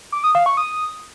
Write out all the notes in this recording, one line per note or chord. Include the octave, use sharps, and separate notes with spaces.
D6
D#6
F5
C#6
D#6